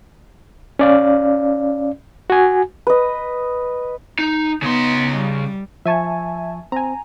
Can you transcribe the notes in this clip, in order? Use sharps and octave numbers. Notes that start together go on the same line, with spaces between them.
C#4 D5 F5
F#4 G#5
B4 D#5
D#4
C#3 B3 D#4 C6
G3
F3 E5 G#5 A5 C#6 G#6
C4 G#5 A#5